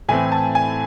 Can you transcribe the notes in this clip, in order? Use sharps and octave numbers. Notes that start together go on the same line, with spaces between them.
A2 E3 A3 C4 G#5
A5
G#5